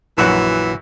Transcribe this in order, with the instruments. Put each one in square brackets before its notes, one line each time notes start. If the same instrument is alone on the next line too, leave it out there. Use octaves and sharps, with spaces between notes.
[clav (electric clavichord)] A#1 F#3 [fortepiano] F#2 F#4 F#6 [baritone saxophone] E3